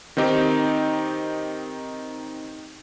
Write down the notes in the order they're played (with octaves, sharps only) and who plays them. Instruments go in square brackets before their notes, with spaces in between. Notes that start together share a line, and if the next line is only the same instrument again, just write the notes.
[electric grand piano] D#3 C4 D#4 G4